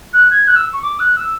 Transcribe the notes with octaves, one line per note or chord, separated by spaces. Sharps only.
F#6
G#6
F#6
E6
C#6
D6
F#6
E6